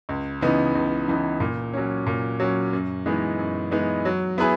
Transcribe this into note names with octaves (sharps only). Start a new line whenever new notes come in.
C#2
C#3 E3 B3 D#4
C#2
C#3 E3 B3 D#4
A#2
F#3 C#4
A#2
F#3 C#4
F#2
E3 G#3 B3 D#4
F#2
E3 G#3 B3 D#4
F#3
B3 E4 G#4 B4